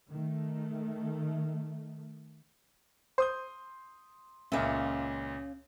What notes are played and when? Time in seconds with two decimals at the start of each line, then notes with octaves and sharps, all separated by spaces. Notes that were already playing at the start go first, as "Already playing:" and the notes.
0.11 D#3 A3
3.18 C5 C6 D#6 G6
4.52 C#2 A#2 C#4 E5 F5